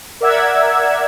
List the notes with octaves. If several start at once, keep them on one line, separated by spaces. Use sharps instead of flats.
A#4 D5 E5 F#5 E6 G#6